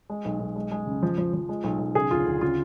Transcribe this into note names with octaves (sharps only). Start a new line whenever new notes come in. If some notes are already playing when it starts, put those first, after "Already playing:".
G#3
B1
B1
G#3
G#3
C#3
F3
F3
F3
G#3
B1
B1
C#3 G#4
D2 F4
D2
C#3 F4